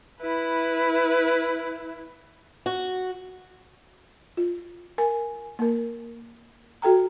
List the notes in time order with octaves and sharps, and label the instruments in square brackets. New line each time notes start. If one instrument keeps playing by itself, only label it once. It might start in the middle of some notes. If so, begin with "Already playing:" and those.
[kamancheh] E4 B4
[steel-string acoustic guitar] F#4
[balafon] F4
A#4 G#5
A#3 A#4
F#4 A4 G5 A#5